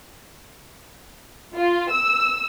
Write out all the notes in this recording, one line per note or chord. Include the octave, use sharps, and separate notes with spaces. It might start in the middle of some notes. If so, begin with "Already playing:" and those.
F4
E6